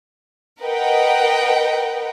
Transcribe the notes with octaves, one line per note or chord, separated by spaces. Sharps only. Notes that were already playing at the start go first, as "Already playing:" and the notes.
A#4 B4 D#5 F#5 G5